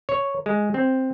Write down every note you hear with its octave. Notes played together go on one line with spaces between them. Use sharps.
C#5
G#3
C4